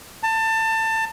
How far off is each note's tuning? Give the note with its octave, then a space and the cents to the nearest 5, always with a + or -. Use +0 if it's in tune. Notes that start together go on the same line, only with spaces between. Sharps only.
A5 +25